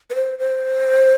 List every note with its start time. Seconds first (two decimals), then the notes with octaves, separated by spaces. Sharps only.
0.10 B4
0.15 C5
0.39 C5